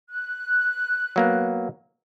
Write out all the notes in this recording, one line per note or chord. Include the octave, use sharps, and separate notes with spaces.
F#6
F#3 A#3 B3